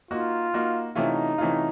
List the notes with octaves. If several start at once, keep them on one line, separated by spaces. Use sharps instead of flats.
A#3 D#4 F4 F#4
A#3 D#4 F#4
C3 E3 A3 C#4 D#4 F4
C3 E3 A3 C#4 F4